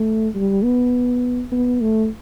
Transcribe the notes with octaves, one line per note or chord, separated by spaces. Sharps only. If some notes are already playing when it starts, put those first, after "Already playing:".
Already playing: A3
G3
B3
B3
A3